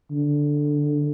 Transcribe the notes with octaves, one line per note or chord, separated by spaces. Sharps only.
D3